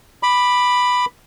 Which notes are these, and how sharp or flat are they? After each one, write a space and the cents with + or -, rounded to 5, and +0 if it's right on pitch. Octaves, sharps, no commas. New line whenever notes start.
B5 +0 D6 +20